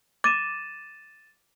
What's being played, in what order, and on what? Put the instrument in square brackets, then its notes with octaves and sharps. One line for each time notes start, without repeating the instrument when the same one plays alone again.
[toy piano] D6 [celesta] A6 D#7 E7